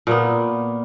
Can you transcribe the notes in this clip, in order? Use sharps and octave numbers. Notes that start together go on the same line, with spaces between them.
A#2 A#3 B3